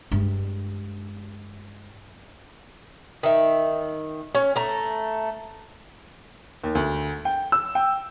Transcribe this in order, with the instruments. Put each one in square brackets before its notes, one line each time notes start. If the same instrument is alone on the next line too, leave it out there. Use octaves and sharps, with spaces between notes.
[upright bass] G2 G#3
[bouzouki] D#3 E5
C#4
A3 A#5
[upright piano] D#2
D2
G5
E6
G5